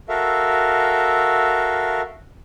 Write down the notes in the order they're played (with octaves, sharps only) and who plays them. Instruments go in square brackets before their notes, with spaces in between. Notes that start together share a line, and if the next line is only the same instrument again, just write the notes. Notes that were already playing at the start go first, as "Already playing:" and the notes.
[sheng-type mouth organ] F#4 A4 A#4 E5 F5